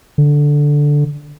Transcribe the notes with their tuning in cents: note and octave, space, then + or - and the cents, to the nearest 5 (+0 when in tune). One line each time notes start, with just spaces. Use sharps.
D3 -5